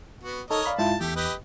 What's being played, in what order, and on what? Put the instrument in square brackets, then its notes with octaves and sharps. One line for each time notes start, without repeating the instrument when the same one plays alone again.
[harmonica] B3 F#4
[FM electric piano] D#4 A4 [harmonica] A#4 C#5 D#5
[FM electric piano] D5 F5 B5
[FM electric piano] G#2 E4 F4 [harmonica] A5
[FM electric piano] E2 [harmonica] A3 G4
[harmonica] G4 B4 D#5